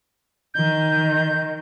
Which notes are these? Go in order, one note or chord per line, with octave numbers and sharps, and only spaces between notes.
D#3 G6